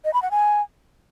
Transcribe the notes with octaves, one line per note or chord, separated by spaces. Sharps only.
D#5
B5
F#5
G#5